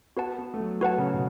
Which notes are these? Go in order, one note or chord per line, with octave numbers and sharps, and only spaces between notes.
B3 F#4 B4 F#5 A5
B3
A3
F#3
F#3 F#4 B4 F#5 A5
C#3
B2